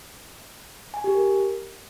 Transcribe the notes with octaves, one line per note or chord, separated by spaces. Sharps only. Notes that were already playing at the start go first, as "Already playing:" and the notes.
G#5
G4
A#4